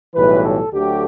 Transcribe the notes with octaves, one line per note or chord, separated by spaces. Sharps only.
B1 A2 E3 G3 B4
A4
D2 D3 F#3 A3 G4